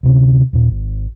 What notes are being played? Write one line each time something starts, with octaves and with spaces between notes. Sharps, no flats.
D2 C3 C#4
D#2 A#2
G#1